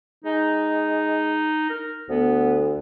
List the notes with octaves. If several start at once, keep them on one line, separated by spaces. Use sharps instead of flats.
G#3 D#4
A#4
D2 B3